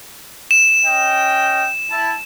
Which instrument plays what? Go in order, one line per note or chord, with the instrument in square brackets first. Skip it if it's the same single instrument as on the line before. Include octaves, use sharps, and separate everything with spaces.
[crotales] E7
[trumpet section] C#4 D#5 G5
E4 A5